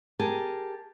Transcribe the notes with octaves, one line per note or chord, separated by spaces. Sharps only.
G4 G#4 A#4 G#5 A5